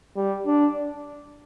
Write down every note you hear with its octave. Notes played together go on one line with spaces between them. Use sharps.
G3
D4